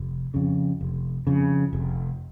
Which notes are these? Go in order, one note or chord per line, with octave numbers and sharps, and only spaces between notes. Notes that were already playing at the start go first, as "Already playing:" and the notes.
Already playing: F1
F2 C#3
F1
F2 C#3
F1